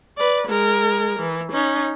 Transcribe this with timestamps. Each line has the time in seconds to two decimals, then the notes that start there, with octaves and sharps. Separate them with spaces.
0.18 B4 D5
0.48 G#3 A#4
1.20 E3
1.52 C#4 D#4